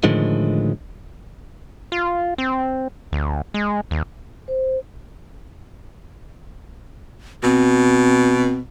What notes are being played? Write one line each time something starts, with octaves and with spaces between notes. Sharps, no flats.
A2 D3 D#3 F3 G#3
F4
C4
D2
G#3
D#2
C5
B2 C4